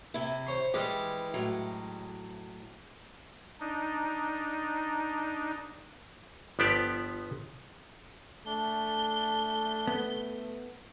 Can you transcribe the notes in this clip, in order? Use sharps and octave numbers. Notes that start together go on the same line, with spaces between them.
C3 E4
C5 C#5 C6
E3 G3 G#3 G4
A2 F#3
D4 D#4
G1 F3 B3 G4 C5 D5
A3 D4 G7
B3